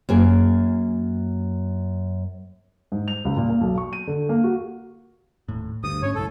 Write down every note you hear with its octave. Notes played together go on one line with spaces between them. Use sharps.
F#2 A#3 G#4
G#2
F7
C#2
A#2
A#3
B1
C#6
D#7
D3
A#3
F#4
D#1 A2
D2 G2 D#6
G#2 C#4 C#5
F#1 B1 A2 A4